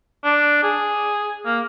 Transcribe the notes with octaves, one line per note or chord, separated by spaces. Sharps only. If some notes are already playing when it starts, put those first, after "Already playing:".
D4
G#4
A#3